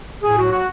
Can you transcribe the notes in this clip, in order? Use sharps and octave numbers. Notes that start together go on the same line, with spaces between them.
A2 G#4
F#4
F#3
F#4